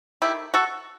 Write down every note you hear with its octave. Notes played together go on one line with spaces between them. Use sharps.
D#3 A3 E4 G4
F#4 A4